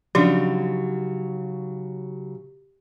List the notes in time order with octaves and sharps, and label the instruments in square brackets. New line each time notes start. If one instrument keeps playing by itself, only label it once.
[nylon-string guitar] C#3 F#3 D#4 [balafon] F3 D4 [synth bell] G4